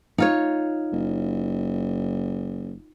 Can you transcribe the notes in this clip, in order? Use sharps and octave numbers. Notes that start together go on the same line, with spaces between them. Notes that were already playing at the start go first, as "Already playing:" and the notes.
D#4 F4 C#5
F#1